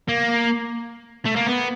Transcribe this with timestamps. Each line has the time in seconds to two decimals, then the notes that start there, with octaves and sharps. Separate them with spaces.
0.08 A#3
1.25 A3
1.36 A#3
1.46 B3